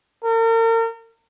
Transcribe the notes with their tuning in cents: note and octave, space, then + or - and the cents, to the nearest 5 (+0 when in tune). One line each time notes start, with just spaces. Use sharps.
A#4 -40